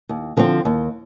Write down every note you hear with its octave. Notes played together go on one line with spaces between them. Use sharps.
D#2
D3 F3 C4
D#2